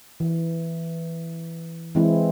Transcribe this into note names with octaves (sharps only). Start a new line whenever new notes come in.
E3
E3 G#3 C4 E4